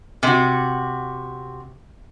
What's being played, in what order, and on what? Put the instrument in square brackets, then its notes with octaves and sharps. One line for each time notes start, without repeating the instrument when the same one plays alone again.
[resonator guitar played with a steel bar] C3 F#4